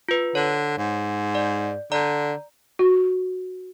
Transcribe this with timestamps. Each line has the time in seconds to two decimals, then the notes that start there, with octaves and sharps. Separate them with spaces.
0.09 F4 B4
0.35 D3 C#5
0.78 G#2
1.35 D5
1.92 D3 D5 A#5
2.79 F#4